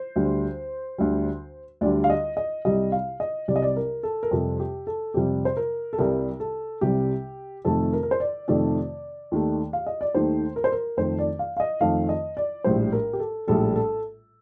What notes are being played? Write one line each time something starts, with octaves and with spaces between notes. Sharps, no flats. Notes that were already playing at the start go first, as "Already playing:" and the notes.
Already playing: C5
D2 D3 G3
D2 D3 G3
D2 D3 G3 D5
F5
D#5
D#5
C2 C3 G3 D#5
F5
D#5
C2 C3 G3 D5
D#5
D5
A#4
A4
A#4
F2 C3 G3 A4
G4
A4
F2 C3 G3 G4
C5
A#4
A4
C2 C3 G3 A#4
A4
C2 C3 G3 G4
F2 C3 D#3 A3 A4
A#4
A#4
C5
D5
F2 C3 D#3 A3 D5
D#2 D#3 A3
F5
D#5
D5
D#2 D#3 A3 C5
A#4
C5
A#4
F2 D#3 A3 C5
D5
F5
F5
D#5
F2 D#3 A3 F5
D#5
D5
A#1 A2 G3 C5
A#4
G4
A4
A#1 A2 G3 A4
A4